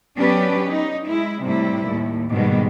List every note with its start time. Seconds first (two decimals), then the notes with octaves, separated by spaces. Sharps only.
0.17 F#3 B3 C#4 D4 G4 B4
0.68 D#4
1.07 G#3 E4
1.43 A2 C3 G3 E4
1.85 D#2 A2
2.31 G#2 B2 D#3 G3 G#3